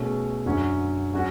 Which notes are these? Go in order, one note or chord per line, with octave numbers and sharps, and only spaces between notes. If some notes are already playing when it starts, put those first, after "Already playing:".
Already playing: B2 A3 C#4 G#4
F#2 D3 F#3 C#4
F#3 C#4 F#4